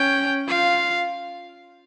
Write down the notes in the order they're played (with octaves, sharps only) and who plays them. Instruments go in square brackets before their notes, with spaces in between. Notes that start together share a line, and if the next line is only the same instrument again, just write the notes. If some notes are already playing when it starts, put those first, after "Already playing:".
Already playing: [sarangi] C#4 [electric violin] G5
[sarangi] F4 [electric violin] F5